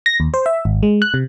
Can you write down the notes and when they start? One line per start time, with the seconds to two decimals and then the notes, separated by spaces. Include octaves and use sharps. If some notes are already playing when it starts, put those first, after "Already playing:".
0.06 A#6
0.20 D#2
0.34 C5
0.46 E5
0.65 G#1
0.83 G#3
1.02 F#6
1.14 C3